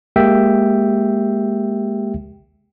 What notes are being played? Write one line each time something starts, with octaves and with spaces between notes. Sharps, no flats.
G#3 A#3 G4 E5 G5